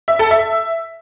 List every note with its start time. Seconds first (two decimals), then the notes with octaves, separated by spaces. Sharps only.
0.08 E5
0.19 A4
0.31 E5